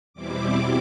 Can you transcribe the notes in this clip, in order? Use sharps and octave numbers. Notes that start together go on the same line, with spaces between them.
E2 B2 G3 C4 E4 D6